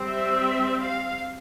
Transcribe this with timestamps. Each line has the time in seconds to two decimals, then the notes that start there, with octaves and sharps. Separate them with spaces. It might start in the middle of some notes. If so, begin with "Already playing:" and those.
Already playing: G3 C4
0.09 E5
0.81 F5